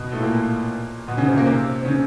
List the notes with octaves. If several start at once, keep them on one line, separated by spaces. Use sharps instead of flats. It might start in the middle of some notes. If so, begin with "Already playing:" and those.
Already playing: B2
A2 A3
A#2 A#3
B2 B3
C#3 C#4
C3 C4
A#2 A#3
C3 C4
C4
C#3 C#4